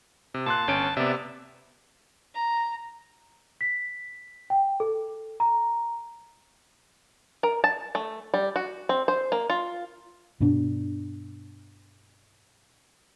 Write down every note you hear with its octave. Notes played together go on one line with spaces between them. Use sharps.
C3
A#2 A5 C6 F#6
G1 C#4 D7
C3 B3 D5 E5
A#5
B6
G5
A4
A#5
A#4
A5
A3
G3
F#4
C4
C5
A#3
F4
G2 B2 B3 D4